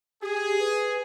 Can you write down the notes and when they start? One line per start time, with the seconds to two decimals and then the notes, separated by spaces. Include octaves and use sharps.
0.22 G4 G#4
0.60 B4